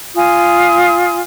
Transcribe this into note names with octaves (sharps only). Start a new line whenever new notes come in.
F4 G#5 D#6